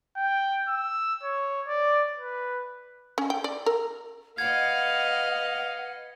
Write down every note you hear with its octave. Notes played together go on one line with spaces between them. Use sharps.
G5
E6
C#5
D5
B4
C#4
G5
D5
A#4
B4 D#5 F5 F#5 G#6